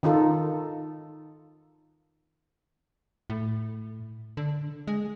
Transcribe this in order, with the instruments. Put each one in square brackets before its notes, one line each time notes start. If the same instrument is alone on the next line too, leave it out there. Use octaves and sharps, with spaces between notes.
[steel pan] D#3 D#4 F4 A4
[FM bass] A2
D3
G#3